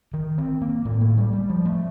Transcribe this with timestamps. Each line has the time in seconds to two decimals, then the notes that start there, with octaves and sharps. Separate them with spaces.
0.14 D#3
0.38 C4
0.62 A#3
0.85 A2 A#3
1.01 A3
1.18 G3
1.33 G3
1.50 F3
1.65 A3